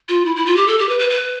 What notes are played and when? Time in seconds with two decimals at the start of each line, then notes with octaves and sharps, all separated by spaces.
0.09 F4
0.25 E4
0.36 E4
0.46 F4
0.56 G4
0.68 A4
0.78 G4
0.89 B4
0.99 B4
1.10 B4